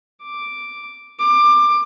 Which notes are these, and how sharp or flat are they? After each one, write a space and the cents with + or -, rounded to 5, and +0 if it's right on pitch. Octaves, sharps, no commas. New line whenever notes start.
D6 +0
D6 +20